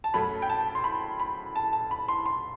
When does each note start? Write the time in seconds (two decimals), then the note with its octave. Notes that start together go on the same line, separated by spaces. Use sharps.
0.04 A5
0.14 F#2 F#3 A3 B5
0.42 G5
0.50 A5
0.75 C6
0.84 B5
1.20 B5
1.56 A5
1.73 A5
1.91 B5
2.08 C6
2.26 C6